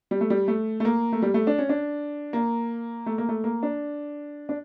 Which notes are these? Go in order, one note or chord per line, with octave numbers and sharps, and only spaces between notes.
G3
A3
G3
A3
A3
A#3
A3
G3
A3
D4
C#4
D4
A#3
A3
A#3
A3
A#3
D4
D4